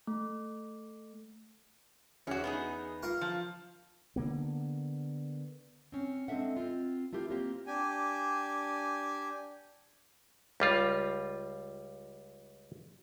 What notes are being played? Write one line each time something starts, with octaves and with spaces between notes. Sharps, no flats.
A3
E2 C#4 F#4
B3 D#4 G#4
F4 A#4 C#6
F3
D3 D#3 A#3 B3
C4 C#4
G#3 C4 D4 A4 E5 F#5
C4 F4
A3 E4 F4 G4 A#4
A#3 C4 F4 G4
D4 G4 G#5
C#2 G3 F4